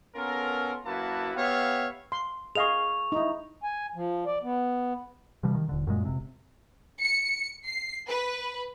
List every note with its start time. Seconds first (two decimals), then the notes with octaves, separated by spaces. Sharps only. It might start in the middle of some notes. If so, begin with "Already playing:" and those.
0.16 B3 C#4 F4 A4 A#4
0.85 F#2 A#3 E4 F#4 B4 A5
1.36 B3 G4 C#5 E5 F5
2.12 C6
2.55 G#4 D#5 F5 C#6 F7
3.12 D#4 E4
3.63 G#5
3.95 F3
4.26 D5
4.43 B3
5.43 C3 E3 F3 G3
5.55 D#3
5.69 D#1 D3
5.87 F#2 A#2 G#3
6.05 F1 C3
6.99 C#7
7.66 C7
8.08 B4